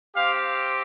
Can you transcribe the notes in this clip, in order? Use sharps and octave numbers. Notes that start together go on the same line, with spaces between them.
C4 G4 F5